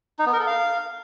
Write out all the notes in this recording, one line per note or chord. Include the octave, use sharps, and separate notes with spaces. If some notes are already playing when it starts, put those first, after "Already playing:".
D#4
B3
A#4
A4
F5